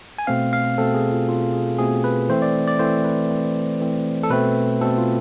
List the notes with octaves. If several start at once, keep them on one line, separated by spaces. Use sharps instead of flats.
G#5
B2 A3 C4 F5
F5
B2 A3 C4 A4
G#4
F4
B2 A3 C4 F4
G#4
B2 A3 C4 G#4
B4
E3 A3 C4 C5
D5
D5
E3 A3 C4 C5
B4
E3 A3 C4
E3 A3 C4
A4
B2 A3 C4 B4
B2 A3 C4 A4
F4